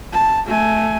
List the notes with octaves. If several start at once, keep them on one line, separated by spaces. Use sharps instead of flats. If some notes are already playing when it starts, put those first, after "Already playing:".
A5
A3 G#5